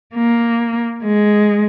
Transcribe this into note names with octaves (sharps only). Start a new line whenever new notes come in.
A#3
G#3